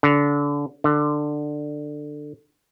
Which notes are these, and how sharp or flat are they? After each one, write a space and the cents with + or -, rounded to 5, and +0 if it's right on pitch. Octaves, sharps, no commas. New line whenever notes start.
D3 -25
D3 +15